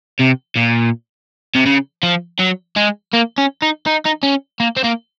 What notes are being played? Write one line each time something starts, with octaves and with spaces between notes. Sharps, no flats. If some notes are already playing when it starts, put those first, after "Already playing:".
C3
A#2
C3
C#3
F3
F#3
G#3
A#3
C#4
D#4
D#4
D#4
C#4
A#3
C4
A#3